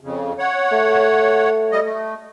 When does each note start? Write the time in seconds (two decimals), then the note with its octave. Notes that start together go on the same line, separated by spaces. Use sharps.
0.01 F2 C#3
0.39 C#5 F#5
0.72 A3
1.72 G3 D#5
1.84 A3